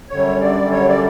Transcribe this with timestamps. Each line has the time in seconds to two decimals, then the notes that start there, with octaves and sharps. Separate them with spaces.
0.10 F#2 D3 G3 C#5
0.41 D5
0.72 C#5
0.88 D5